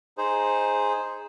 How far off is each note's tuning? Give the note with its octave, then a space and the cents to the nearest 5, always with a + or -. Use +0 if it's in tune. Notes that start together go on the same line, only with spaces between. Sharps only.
D#4 +0 G#4 +0 C5 +0